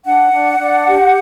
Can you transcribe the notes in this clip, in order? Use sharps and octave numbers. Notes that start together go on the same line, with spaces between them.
D4 F#5
D4
D4
G4